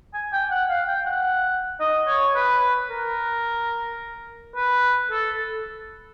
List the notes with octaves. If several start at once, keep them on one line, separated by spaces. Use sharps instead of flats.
G#5
G5
F#5
F5
G5
F#5
D#5
C#5
B4
A#4
B4
A4